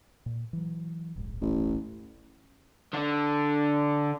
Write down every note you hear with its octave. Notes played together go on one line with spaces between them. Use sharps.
A#2
E3 F#3
D1 A#1 G#2
A1
D3 D4